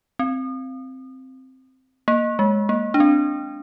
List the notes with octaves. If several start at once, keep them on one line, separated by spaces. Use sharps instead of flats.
C4
A#3
G#3
A#3
D4
C4